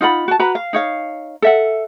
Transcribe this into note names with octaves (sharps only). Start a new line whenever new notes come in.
D#4 F4 F#5 B5
F#4 A5
F#4 B4 A#5 B5
F5
D#4 C#5 F5
A4 E5 F#5